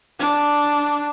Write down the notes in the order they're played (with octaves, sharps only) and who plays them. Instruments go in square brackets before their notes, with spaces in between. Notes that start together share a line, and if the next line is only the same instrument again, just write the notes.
[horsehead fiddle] D4